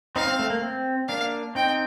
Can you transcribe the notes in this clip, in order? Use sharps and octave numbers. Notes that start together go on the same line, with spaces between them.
C4 D#4 F5
C4
A3
A#3
C4
A#3 D4 F5
C4 D#4 G5